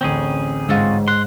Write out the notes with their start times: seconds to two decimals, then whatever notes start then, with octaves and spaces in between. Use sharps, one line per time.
0.01 A1 D2 C4 C#4 G#4
0.69 G#2 F4 F#4 E6
1.08 F#5 C6